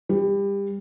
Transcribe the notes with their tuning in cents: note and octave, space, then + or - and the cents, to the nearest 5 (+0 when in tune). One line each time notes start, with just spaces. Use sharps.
G3 +25